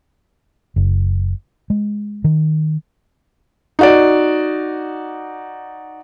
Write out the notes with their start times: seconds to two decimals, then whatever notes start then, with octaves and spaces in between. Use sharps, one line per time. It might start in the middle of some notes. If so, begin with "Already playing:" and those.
0.76 F#1
1.70 G#3
2.24 D#3
3.79 D#4 F#4 D5